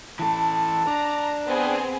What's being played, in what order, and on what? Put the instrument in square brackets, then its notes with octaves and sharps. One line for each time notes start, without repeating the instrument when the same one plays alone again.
[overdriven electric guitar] E3 A4 [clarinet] A5
[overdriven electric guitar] D4 [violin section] A#5
[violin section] B3 C4 G#4